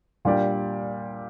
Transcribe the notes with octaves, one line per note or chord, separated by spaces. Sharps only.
A#2 G3 D4 G4 D5